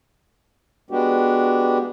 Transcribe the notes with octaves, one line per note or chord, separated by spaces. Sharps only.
G#3 B3 D4 F#4 G4